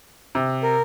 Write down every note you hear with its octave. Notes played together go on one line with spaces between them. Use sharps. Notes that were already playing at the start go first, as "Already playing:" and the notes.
C3
A#4